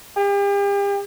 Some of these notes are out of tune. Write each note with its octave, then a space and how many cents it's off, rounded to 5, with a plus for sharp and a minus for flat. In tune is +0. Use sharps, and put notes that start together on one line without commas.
G4 +40